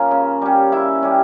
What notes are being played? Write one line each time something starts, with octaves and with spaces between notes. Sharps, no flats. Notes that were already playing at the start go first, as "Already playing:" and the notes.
Already playing: F3 A#3 C#4 F4 C#5 F5
C#3
G3 C#4
C#3 E4 E5
G3 C#4